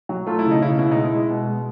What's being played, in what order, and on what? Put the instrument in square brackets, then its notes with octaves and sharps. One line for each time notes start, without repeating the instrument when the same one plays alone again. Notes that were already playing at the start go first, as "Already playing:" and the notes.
[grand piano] F#3
A3 F4
E4
C#3
D#4
C#3 E4
B2 E4
G#3 D#4
E4
G#3
B2
G#3